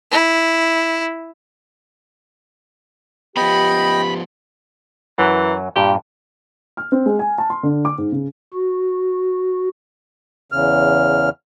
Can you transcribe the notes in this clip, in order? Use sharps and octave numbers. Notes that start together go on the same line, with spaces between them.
E4
F3 B3 G4 D#5 G5 B5
F#2 E3 F#3
G2 A#2 G4
F6
C4
G#3
G#5
A5
C6
D3
D6
G#2
C#3
F#4
E2 C#3 F6